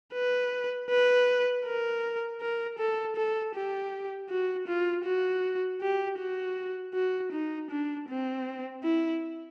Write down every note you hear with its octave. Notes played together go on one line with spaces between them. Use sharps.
B4
B4
A#4
A#4
A4
A4
G4
F#4
F4
F#4
G4
F#4
F#4
D#4
D4
C4
E4